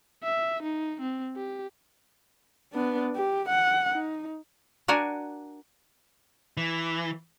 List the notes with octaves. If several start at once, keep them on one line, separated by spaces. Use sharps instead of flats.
E5
D#4
C4
G4
B3 D4
G4
F#5
D#4
D4 F#4 A#4 G#5
E3